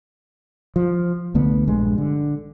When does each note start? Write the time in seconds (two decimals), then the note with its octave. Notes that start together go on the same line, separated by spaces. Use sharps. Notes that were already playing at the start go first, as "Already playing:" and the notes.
0.76 F3
1.34 C2 D3 A3 B3
1.67 A#1 G2 G#3
1.98 D3